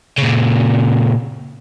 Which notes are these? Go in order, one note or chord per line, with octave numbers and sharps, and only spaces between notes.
A#2 C#3